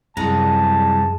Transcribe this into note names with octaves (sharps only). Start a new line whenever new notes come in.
C2 F#2 G#3 B3 G#4 A5 A#5